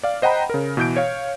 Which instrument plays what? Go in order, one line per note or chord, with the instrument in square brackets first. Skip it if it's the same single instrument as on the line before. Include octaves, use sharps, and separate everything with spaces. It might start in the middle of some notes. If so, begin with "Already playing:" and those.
[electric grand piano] D5 F5
C5 D#5 F#5 G5 A#5 B5
C#3 A#4
B2 E3 G6 D7
C#5 F5